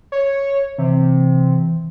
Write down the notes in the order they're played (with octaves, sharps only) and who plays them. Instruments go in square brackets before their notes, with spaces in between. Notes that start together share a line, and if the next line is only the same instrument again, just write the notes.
[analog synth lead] C#5
[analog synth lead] C3 [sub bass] E3